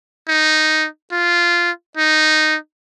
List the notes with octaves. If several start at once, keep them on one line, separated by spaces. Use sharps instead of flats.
D#4
F4
D#4